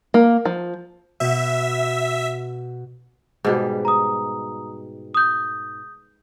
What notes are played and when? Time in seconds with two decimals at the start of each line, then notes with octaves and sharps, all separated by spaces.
0.14 A#3
0.45 F3
1.20 B2 E5 F#5
3.45 G#2 B2 G3
3.85 A#5 D#6
5.14 D#6 G6